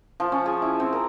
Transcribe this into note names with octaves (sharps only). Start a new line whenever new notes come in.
F3
C#4
G#4
E4
C4
A#4